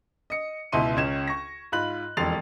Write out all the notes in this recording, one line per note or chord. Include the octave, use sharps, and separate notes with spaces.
D#5 C#7
C#2 B2 E4 C6 D#7
C#2 C#4 G#6 E7
C#6 A#6
G#2 F4 B5 F#6 F#7
E1 F2 C6 A6 C7 F7